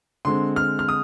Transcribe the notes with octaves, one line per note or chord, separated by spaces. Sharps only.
D3 G#3 C4 C6
F6
F6
D#6